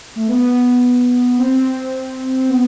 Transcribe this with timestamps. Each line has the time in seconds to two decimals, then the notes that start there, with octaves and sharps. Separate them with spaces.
0.16 A3
0.28 B3
1.32 B3
1.38 C4
2.37 C4
2.49 B3